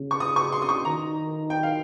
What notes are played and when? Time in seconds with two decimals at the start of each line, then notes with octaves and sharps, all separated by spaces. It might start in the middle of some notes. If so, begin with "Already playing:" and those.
Already playing: C#3
0.11 C#6
0.20 D#6
0.36 C#6
0.52 C6
0.62 D#6
0.69 C#6
0.85 D#3 A#5
1.50 G5
1.63 F5